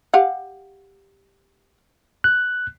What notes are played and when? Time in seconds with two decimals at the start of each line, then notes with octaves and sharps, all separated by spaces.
0.14 G4 F5 F#5
2.24 F#6